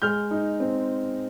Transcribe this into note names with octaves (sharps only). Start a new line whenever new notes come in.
G#3 F6 G6
D#4
C4